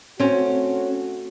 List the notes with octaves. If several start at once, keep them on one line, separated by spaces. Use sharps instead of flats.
A3 C4 C#4 F#4